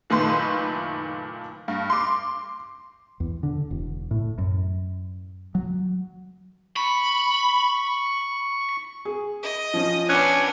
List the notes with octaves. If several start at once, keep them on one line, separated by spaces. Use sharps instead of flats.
F#1 A#2 D#3 A3 B4 C6
G2
C6 D6
E2
D3
E1
A2
F#2
F#3
B5 C#6
G#4
D#5
F3 C#4
B3 C#4 D4 F#6